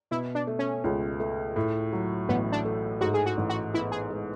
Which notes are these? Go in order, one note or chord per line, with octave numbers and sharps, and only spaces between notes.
B2 E4
D4
A3
C#4
C#2
A3
A2
F#3
A1 B3
D4
A3
G#2 F#4
G#4
F#4
A1
F#4
B3 E4
G#4
G#3